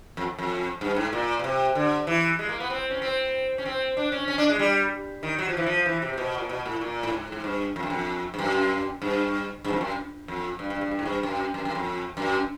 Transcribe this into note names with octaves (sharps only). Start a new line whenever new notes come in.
F2
F2
G2
G#2
A#2
B2
C3
D3
E3
G#3
A#3
B3
C4
C#4
C4
C#4
C4
D4
C#4
C#4
D4
G#3
G3
D#3
F#3
F3
E3
F3
E3
C3
C3
B2
A#2
B2
A2
A#2
A2
G#2
G#2
G2
F2
F#2
F2
G2
F#2
G2
G2
F2
F#2
F2
G2
G2
G2
G2
G#2
G2
F#2
F#2
F#2
F2
F#2